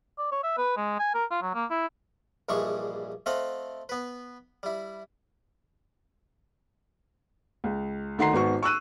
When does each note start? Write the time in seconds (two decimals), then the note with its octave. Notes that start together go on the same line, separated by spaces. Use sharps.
0.19 D5
0.32 C#5
0.44 E5
0.58 B4
0.77 G#3
0.99 G#5
1.15 A#4
1.31 F4
1.42 F#3
1.54 A#3
1.71 E4
2.49 A#1 G2 E3 G3 G#3 C#6
3.26 A3 C4 D#5 F5 F#5
3.89 B3 B4
4.63 G3 E4
7.64 C#2
8.18 D2 D#3 F#5 A#5 C6 C7
8.33 G#1 B3 F#4 C#6
8.63 C#6 E6 F#6 D#7